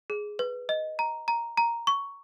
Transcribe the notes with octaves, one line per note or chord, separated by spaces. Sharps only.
G#4
B4
D#5
A#5
A#5
A#5
C#6